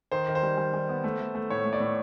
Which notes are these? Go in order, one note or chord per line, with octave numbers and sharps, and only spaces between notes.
D#3 C5
D#3
C5
G3
G3
G3
B3
A3
A3
A3
A2 C#5
A3
D5
A2